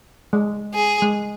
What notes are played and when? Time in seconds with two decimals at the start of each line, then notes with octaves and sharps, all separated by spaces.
0.33 G#3
0.74 G#4
1.02 G#3